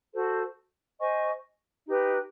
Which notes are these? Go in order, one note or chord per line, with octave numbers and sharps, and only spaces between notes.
F#4 A4 C5
C5 D#5 G#5 C#6
D#4 G4 B4